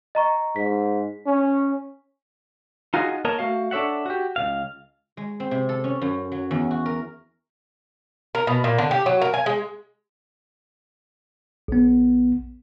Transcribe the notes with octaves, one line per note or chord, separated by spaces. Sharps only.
D#5 A#5 C#6
G#2 B6
C#4
D#4 F4 F#4 G#4 C5 D#5
A#3 A#4 C#5 D#5 A5 A#5
A3 F#4 F5
D4 A4 C#5 E5 F#5
F#4 G4
C#2 B2 F5
G#3
C4
C3
A4
C#4
F#2
F#3
E2
F#4
A#4
A#4
B2
A#2
D3
G4
F#3
A#4
G#5
G#3
A#1 B3